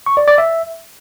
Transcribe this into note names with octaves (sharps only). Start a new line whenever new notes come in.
C#6
D5
D5
E5